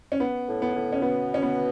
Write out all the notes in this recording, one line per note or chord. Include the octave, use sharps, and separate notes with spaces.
C#4
B3
A2
B3
A2
C#4
B2 B3
C#4
B3